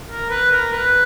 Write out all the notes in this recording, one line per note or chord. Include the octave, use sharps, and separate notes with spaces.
A#4
B4
A#4
B4